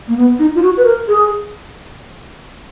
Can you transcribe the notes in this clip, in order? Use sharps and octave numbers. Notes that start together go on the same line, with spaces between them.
A#3
B3
D#4
F4
F#4
B4
A#4
G#4